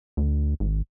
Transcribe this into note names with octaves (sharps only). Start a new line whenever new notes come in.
D2
G#1